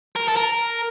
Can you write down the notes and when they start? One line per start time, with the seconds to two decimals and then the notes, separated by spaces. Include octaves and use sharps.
0.16 A#4
0.28 A4
0.36 A#4